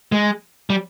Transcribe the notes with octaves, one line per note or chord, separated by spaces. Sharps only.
G#3
G3